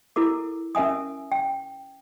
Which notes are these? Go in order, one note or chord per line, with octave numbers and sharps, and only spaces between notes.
E4 A4 A#4 D6
C#4 A#4 E5 G#5 D#6
G5